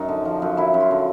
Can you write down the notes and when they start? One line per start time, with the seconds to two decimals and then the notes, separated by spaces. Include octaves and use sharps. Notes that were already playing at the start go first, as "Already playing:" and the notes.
Already playing: F#2 D#4
0.08 D3
0.25 F3
0.42 F#2
0.57 F#2 E4
0.74 F#2
0.80 F4
0.91 D3